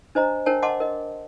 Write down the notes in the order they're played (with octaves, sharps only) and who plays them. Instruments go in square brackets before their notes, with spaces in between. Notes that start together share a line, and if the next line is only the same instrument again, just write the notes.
[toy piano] D4 C5 D#5 A#5
D4 A#4 C5 C#5 G5 A5
D#5 F#5 A5 C6 D6
A#4 D#5